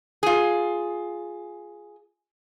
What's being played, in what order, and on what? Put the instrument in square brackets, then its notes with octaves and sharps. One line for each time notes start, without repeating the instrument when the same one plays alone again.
[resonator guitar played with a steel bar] F4 G#4